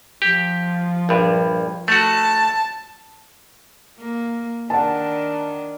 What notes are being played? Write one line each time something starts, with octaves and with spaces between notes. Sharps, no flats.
F3 G4
A#1 G2
A3 F#4 A5
A#3
D#3 D4 F#5 A5